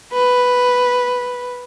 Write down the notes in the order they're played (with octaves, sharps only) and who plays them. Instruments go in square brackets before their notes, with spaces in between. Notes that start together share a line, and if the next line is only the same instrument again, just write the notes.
[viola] B4